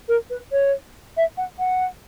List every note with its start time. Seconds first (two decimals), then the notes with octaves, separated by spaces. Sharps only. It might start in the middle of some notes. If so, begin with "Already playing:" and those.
0.08 A#4
0.30 B4
0.52 C#5
1.17 E5
1.37 F#5
1.59 F#5